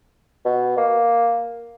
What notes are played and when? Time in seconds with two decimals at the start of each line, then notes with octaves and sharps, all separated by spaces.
0.45 B2
0.77 A#3